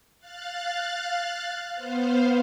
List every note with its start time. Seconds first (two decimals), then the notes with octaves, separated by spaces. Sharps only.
0.19 F5 F#6 A6
1.75 B3 C5 F5